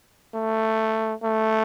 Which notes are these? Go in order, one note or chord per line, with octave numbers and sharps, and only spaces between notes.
A3
A3